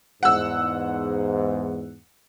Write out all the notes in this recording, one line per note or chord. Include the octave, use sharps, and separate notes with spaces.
E2 G#2 F#5 E6